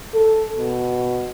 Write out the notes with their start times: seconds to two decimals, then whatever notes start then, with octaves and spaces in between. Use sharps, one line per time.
0.14 A4
0.58 B2